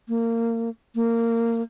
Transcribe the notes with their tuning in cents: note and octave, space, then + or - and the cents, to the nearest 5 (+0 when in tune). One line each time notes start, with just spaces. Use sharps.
A#3 -25
A#3 -15